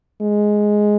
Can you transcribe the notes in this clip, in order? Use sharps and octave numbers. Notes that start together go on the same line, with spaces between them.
G#3